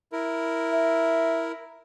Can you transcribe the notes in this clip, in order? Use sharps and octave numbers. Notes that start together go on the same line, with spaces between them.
E4 A#4
E5